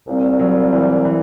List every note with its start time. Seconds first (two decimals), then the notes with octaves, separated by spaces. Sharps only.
0.06 C2 A#2 G3 C4
0.39 F#3
0.73 E3
1.05 E3